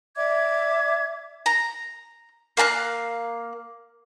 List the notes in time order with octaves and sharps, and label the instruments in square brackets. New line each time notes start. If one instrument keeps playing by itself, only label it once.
[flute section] D5 E5 D6 G#6
[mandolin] A#5
A#3 F5 A5 F#6